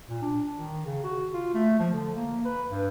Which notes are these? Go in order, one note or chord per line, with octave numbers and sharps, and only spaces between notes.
A#2
D4
D#3
C#3
F#4
F4
A3
F3
D3
A#3
B4
G2